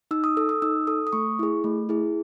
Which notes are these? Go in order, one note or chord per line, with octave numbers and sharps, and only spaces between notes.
D#4 E6
D#6
A4 E6
D#6
D#4 E6
A4 D#6
D#6
A3 C#6
E4 G#4
A3
E4 G#4